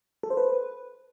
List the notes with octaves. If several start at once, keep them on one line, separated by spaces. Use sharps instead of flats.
A4
C5
B4